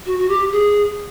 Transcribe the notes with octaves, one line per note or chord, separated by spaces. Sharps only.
F#4
F#4
G4
G#4